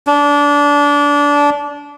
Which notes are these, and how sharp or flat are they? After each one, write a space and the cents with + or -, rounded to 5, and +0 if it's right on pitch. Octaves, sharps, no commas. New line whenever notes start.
D4 -25